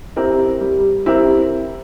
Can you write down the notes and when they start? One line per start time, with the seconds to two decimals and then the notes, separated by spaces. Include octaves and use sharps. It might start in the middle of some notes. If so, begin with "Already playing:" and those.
0.16 C4 E4 G4 A#4
0.60 G3
1.06 C4 E4 G4 A#4